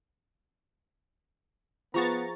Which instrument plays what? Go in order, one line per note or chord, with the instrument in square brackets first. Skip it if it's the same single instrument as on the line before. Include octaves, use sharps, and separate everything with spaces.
[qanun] F3 G#4 E5 [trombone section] B3 [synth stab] A#5 C#6 A6